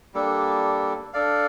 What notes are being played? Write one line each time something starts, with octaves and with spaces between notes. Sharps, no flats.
G3 A#3 D4 A4
D4 A4 D5 F5